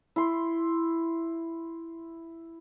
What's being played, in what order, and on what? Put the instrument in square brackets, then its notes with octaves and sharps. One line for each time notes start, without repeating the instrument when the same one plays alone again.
[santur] E4 C6